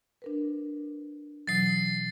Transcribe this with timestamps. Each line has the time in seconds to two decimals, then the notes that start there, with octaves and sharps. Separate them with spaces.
0.22 D4 A#4 B4
1.47 B2 E3 F#3 A6 C7